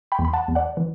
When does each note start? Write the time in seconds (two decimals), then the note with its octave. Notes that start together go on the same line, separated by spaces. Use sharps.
0.12 G5 B5
0.19 E2
0.25 B5
0.33 F#5 A5
0.48 E2
0.55 D5 F#5
0.77 E3